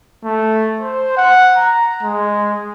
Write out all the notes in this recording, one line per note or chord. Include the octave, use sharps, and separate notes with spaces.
A3
C5
F#5
A#5
G#3